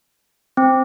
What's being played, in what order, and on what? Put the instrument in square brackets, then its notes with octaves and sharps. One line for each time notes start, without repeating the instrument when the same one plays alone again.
[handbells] C4